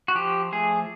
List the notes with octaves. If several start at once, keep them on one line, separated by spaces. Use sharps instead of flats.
F#4
F3 G4
A3 G#4